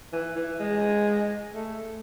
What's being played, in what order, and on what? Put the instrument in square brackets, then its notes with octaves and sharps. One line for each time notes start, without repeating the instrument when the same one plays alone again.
[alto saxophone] E3
E3
G#3
A3